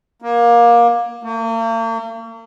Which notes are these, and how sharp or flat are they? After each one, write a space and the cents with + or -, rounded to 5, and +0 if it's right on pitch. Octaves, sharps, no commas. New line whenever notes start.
A#3 +20
A#3 -45